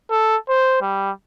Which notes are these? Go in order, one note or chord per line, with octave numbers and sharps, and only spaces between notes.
A4
C5
G3